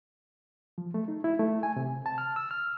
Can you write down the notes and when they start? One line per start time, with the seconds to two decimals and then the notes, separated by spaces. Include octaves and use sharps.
0.78 F3
0.94 A3
1.08 D#4
1.24 E4
1.39 A3
1.63 G#5
1.76 C3
2.06 A5
2.18 F6
2.36 E6
2.51 F6